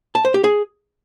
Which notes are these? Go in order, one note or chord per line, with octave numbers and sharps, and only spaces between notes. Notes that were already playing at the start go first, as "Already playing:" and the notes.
A5
C5
G4
G#4